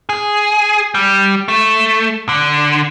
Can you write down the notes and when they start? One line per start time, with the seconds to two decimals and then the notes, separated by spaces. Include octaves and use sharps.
0.09 G#4
0.95 G3
1.48 A3
2.29 D3